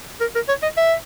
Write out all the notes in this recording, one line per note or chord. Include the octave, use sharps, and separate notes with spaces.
A#4
A#4
C#5
D#5
E5